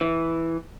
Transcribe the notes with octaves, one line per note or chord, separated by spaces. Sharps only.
E3